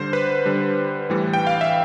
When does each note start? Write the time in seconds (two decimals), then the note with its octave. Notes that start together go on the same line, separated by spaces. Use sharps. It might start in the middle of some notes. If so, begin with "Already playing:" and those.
Already playing: D3 G3 C5
0.13 B4
0.46 D3 G3
1.10 A2 E3 G3
1.33 G5
1.47 F5
1.61 E5